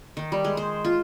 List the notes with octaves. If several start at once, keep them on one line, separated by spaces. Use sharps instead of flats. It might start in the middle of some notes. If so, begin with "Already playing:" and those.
D#3
G3
G#3
C5
F4